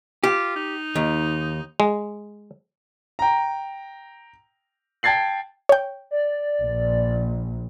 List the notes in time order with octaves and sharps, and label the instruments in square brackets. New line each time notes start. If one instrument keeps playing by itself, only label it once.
[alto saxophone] F4 [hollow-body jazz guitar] G4
[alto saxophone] D#4
[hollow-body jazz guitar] D#2
[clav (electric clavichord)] G#3
[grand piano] G5 A#5
G5 A5 G#6 A6 C7 F#7
[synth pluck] C#5 G5
[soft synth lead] D5
[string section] A#1